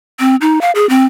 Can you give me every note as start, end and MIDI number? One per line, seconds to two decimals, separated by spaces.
0.20 0.36 60
0.41 0.61 63
0.61 0.71 77
0.75 0.88 68
0.89 1.06 60